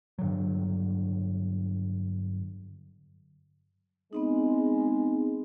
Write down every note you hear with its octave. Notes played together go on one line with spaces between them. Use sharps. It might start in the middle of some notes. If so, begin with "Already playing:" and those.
G2 D3 F#3
G#3 B3 C4 D#4